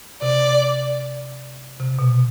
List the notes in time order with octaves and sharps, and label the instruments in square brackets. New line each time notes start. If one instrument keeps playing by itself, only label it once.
[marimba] C3 [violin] D5
[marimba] C3
B2